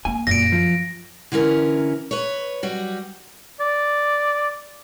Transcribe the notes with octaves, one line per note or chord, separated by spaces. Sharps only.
A#3 G#5
F#2 A#2 A#6 D7
F3
D3 E3 C#4 A#4 B4
B4 C#5
F#3 G3 F#4
D5